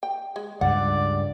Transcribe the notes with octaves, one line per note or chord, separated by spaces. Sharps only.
G5
G#3
C#2 G2 D5 F#5